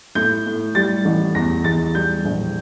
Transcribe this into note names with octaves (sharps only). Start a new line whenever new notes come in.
A2 G6
A2
G3 A6
A1
E2 A#6
E2 A6
G3 G6
A#1